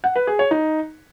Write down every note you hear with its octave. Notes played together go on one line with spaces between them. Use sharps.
F#5
B4
G#4
C#5
D#4